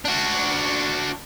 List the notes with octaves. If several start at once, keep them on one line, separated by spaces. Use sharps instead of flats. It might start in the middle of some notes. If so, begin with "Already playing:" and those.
D4 F#4